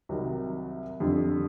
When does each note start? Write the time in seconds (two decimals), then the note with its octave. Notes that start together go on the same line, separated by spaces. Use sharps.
0.09 C2 C3 D#3 F#3
1.00 F2 D3 G3